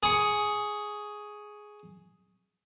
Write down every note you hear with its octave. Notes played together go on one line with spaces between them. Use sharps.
G#4 C#6